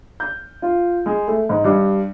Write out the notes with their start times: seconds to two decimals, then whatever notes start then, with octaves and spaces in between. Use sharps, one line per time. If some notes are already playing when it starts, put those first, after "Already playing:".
0.20 G6
0.62 F4
1.06 G#3
1.28 A3
1.49 G#2
1.64 G2